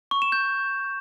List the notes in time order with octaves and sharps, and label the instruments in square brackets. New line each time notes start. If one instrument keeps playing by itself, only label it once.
[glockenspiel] C#6
E7
G6